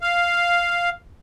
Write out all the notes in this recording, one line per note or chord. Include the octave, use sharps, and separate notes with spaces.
F5